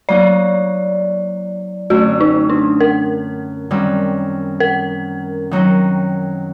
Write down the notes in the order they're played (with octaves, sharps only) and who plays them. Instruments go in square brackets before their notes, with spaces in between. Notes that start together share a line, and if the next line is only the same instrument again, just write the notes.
[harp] F#3 A#3 D#4 [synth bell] D5
[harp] F#2 D3 A3 C4 [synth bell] F#4
[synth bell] D#4
D4
A#4
[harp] F#2 D#3 G3 C4
[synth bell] A#4
[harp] D#3 F#3 C4 D#4